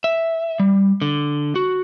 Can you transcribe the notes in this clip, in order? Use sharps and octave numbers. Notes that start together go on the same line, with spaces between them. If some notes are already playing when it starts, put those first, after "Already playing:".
E5
G3
D3
F#4